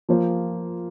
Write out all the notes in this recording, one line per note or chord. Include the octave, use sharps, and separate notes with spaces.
F3 A#3 F4 C5